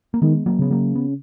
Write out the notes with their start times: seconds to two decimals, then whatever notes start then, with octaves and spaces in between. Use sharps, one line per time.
0.14 A#3
0.22 D#3 G#3 B3
0.46 F#3 A#3
0.59 C#3 B3
0.71 F#3 A#3
0.95 B3